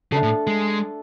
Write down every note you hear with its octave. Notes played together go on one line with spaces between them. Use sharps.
C#3 A3 D4 A4
A2
G#3